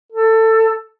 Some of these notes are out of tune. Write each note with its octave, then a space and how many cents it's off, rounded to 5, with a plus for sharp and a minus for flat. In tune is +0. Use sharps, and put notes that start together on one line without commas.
A4 +20